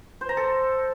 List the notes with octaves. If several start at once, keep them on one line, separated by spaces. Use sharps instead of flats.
C5
A#5
A4